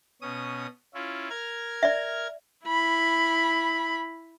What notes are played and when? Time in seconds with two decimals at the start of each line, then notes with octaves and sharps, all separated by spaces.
0.22 B2 C#4 D#6
0.94 C#4 E4 F4
1.30 A#4 F6 G#6
1.83 D5 E5
2.67 E4 B5